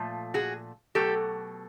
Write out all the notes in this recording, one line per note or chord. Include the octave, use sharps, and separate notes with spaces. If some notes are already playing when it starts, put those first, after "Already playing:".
Already playing: A#2 F3 A3
F#4 G#4
B2 F#3 A3 G4 A4